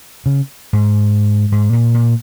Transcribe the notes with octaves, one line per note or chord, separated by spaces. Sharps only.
C#3
G#2
G#2
A#2
A#2